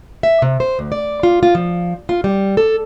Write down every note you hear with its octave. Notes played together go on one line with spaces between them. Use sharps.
E5
C3
C5
D2
D5
F4
F4
F3
F4
G3
A4